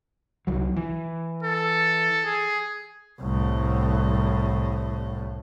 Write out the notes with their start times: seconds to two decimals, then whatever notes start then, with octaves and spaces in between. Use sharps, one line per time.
0.47 C2 F#3
0.76 E3
1.43 A4
2.25 G#4
3.21 C2 A2